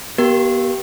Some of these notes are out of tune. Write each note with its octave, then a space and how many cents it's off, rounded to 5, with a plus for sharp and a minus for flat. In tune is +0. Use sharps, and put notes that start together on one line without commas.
B3 -35 G4 -25 A#4 +5